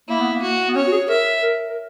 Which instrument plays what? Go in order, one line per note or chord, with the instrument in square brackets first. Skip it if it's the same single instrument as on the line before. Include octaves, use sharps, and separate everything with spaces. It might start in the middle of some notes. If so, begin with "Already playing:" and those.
[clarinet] A#3 [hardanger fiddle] E4
[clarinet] B3
A#3
[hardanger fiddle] F#4
[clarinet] B3
[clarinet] C#4 [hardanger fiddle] C#5
[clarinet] F#4
G#4
[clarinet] A#4 [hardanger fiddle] E5
[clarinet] A#4
A#4